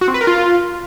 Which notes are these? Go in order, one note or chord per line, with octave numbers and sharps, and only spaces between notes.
F#4
C4
B4
A#4
F4